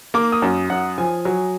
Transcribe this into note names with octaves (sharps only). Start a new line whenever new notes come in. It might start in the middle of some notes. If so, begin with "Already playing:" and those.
A#3 D6
D#6
F#2
F#2 F#5
F3 G#5
F#3